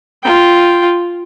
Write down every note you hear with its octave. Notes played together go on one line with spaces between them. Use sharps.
F4 G5